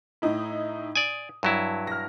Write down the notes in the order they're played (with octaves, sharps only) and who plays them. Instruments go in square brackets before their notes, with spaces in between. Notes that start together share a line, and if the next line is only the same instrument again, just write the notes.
[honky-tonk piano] A2 D#4 E4
[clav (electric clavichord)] D5 G#5 [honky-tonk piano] D#6
[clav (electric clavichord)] G2 F#3 E4
[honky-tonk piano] F6 A#6